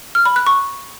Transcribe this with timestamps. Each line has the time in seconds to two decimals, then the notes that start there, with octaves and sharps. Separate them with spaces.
0.15 F6
0.25 B5
0.36 F#6
0.46 C#6